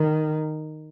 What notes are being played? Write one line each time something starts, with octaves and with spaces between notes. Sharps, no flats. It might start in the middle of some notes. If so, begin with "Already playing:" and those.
Already playing: D#3